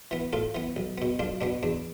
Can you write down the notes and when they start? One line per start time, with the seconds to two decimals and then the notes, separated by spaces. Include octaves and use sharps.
0.11 E3 B3
0.33 A2 F4 A4
0.55 E3 B3
0.76 B1
0.98 B2 B3
1.19 B1 D4 F4
1.41 B2 B3 D4
1.63 E2 D4